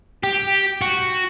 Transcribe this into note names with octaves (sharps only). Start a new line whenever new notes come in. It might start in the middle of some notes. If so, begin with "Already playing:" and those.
G4
F#4